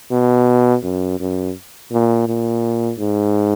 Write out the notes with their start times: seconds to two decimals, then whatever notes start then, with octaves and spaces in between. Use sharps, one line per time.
0.11 B2
0.83 F#2
1.19 F#2
1.92 A#2
2.27 A#2
2.99 G#2